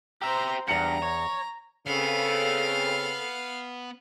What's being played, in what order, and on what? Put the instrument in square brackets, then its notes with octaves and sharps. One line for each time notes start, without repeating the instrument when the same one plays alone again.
[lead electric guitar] G4 E5 [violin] C5 A#5
[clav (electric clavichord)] E2 F#5 [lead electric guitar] G2 [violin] A#5
[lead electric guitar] C#5
[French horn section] C#3 [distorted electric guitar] B3 [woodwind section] C4 A4 [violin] F5